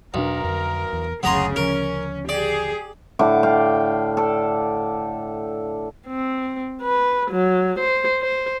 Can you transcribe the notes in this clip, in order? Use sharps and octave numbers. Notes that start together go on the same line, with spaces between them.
B1 E2 B2 D4 A#4
F2 D3
E2
F#1 D2 C#3 F#3 B3 G#4 A#5 C6
D2 C#3 F3 C#4 A#4
G4 G#4 D5
A2 D3 F#5 D6
D5 F5 G5
A4 D5
C4
B4
F#3
C5
C5